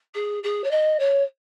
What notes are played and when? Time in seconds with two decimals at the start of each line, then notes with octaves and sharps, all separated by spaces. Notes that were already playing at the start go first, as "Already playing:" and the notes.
0.14 G#4
0.43 G#4
0.64 C#5
0.71 D#5
0.99 C#5